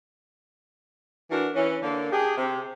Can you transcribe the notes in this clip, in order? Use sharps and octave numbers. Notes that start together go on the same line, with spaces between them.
E3 D4 F#4 A#4
E3 C#4
D3 A#3
D4 G4 G#4
C3